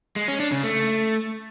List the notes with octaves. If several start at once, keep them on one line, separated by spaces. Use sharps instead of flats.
G#3
C#4
D4
C#3
A3